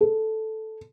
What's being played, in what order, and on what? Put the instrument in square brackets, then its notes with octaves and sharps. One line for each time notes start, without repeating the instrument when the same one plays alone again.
[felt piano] A4